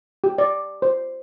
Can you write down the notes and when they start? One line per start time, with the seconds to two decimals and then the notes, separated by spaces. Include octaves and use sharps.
0.24 G4
0.38 D5
0.82 C5